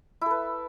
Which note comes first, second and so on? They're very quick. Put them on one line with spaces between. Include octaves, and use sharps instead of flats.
E4 A4 B4